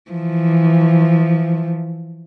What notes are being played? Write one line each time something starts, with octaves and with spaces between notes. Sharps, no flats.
E3 F3